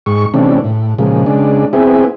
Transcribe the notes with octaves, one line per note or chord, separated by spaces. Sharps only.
G#2 C#6
C3 E3 A3 C#4 D4
A2
A#2 C#3 F3 G#3
C#3 G#3 D4
B3 C4 E4 G#4